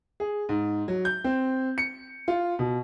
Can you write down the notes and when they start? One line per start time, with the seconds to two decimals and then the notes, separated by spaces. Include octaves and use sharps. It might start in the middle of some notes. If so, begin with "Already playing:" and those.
0.20 G#4
0.49 G#2
0.88 F#3
1.05 G6
1.24 C4
1.78 C#7
2.28 F4
2.59 B2